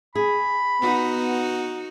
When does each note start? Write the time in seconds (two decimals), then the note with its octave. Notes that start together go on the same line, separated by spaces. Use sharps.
0.15 G#4 B5
0.82 B3 D#4 F#4